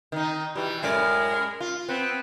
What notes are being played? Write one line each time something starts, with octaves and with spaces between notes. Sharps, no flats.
D#3 D#4
B2 E3 G3
F#2 A2 G#3 A#4 D5
F4
B3 C4 B4